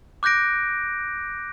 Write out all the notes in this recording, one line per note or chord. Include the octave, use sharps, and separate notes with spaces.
D6 F#6 G6 A#6 D7